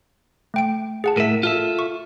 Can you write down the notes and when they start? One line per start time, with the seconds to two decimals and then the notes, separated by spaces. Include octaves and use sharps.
0.54 A3 G5 D7
1.04 G#4 F#5 A5
1.17 A2 A#4 E5
1.43 F4 A4 E5
1.79 C#6